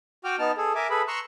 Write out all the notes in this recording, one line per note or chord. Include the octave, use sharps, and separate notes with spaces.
F#4 G5 D6 F6
B3 D#4 A5 F6
G#4 A4
A#4 E5 G#5 D6
G#4 A4 B4 B5
A#5 C6 C#6 E6 F#6